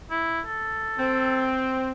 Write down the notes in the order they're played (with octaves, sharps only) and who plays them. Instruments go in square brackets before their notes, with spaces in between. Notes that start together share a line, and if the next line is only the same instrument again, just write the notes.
[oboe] E4
A4
[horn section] C4